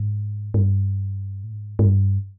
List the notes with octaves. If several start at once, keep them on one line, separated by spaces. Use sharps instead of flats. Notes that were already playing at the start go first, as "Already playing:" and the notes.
Already playing: G#2
G#2
G2
A2
G#2
G#2
G2